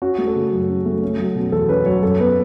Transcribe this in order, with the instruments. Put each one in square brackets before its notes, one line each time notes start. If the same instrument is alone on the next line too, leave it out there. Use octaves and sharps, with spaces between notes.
[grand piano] C#4 F#4
A3
A4
C#3
F#2
C#4
A3
C#4
F#3
B2
E2 A4
C#4 B4
F#3 C#5
F#2 A4
B3 B4